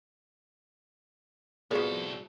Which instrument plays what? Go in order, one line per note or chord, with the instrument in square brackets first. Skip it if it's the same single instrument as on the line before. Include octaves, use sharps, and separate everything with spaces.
[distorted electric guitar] C2 A4 [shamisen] F3 B3 [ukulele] F#4 G#4 D5